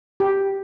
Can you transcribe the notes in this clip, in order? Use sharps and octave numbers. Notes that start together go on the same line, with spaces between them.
G4